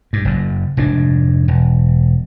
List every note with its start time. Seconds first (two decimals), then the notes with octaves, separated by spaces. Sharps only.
0.13 G2
0.25 F#1 F#2
0.77 F1 G#2 D4
1.48 E1